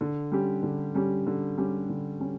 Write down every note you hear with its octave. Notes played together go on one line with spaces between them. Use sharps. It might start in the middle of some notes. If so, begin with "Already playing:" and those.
D3
G3 C#4 G4
D3
G3 C#4 G4
D3
G3 C#4 G4
D3
G3 C#4 G4